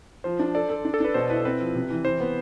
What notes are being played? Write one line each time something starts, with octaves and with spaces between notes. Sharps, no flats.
F3 C5
D4
A4 D5
A4
D4
A4
D4 B4
B2 C5
E4 B4
C4 B4
F3
C3
E3
E3 C5
B3